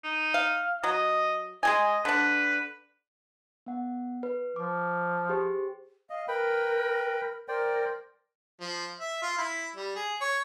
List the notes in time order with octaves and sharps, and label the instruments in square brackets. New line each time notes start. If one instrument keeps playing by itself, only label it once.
[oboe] D#4
[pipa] F5
[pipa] F#3 [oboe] D#5
[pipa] G#3 G#4 G#5 [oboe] D#5
[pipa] D3 D4 [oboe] B4
[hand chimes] B3 F#5
B4
[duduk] F3 [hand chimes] D6
[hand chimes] G4 G#4 C5
[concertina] D#5 [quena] F5
[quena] A#4 [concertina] B4 G5 B5
[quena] A#4 [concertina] C5 D5 G5
[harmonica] F3
E5
F4
E4
G3
G#4
C#5